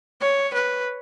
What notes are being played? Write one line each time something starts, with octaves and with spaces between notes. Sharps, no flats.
C#5
B4